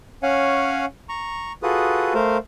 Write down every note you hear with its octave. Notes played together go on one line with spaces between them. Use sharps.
C#4 C#5 F5 F#5 G#5
A#5 C#6
F4 F#4 G#4 A4 B4 D#6
A3 A#4 C5 F5